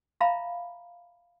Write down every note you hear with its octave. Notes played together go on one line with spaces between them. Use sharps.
E5 F5 A#5 B5